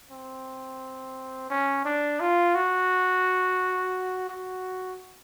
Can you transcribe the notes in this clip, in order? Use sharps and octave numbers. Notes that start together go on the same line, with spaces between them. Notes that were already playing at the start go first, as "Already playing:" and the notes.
C4
C#4
D4
F4
F#4
F#4